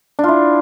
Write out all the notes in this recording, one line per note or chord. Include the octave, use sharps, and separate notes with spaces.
D4 E4 F4